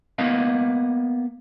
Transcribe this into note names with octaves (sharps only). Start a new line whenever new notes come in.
A#3 B3 D#5 F5